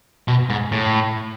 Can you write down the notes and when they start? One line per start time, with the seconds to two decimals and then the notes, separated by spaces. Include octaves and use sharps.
0.28 B2
0.50 G#2
0.72 A2